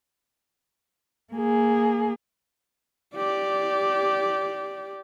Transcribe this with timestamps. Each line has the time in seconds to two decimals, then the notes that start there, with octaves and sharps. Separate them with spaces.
1.33 A#3 G#4
3.15 G4 D5